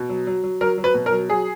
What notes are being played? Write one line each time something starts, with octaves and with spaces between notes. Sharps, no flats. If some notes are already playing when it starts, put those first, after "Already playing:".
Already playing: B2
F#3
F#3
F#3
F#3 A#4
F#3
B4
B2
A#4
F#3
F#3 G#4